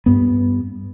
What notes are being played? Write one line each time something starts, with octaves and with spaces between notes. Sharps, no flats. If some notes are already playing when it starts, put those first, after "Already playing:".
G2 B3